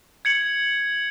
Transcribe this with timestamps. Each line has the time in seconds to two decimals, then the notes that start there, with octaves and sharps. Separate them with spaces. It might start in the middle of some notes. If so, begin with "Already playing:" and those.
0.25 G#6 C#7 F#7